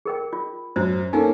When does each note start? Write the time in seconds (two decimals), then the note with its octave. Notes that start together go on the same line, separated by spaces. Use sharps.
0.06 G#4 A#4 G5
0.33 F4
0.76 F#2 C5
1.13 A#3 C#4 D#4 A4 G#5